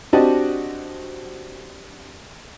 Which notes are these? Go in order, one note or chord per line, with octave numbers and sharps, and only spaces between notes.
C4 D4 F#4 G4 D#5 A5